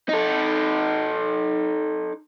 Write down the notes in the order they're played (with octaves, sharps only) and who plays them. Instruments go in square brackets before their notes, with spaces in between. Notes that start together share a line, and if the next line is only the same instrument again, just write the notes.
[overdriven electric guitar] D#4 A4